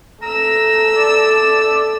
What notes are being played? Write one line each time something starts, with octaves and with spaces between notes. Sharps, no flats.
A3 A#5 E6
D5